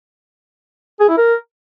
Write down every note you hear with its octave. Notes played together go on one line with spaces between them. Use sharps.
G#4
E4
A#4